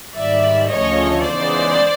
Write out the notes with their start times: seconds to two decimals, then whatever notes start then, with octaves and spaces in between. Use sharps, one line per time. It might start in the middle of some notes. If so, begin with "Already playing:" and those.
0.14 G#2 D#3 G3 D5 E5
0.68 D2 C#3 F3 A3 C#4 C#5 D#5
1.21 C#3 E3 G#3 B3 D#4 C5 D5